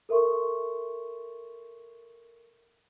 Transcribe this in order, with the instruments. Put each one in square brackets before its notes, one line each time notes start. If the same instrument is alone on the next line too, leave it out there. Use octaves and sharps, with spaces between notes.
[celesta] A4 A#4 E5 C6 C#6